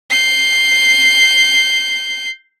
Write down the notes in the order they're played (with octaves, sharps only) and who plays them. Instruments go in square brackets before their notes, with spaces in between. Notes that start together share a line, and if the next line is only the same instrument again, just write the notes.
[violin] G6 C7